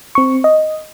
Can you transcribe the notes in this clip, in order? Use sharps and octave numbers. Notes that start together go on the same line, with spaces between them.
C4 C#6
D#5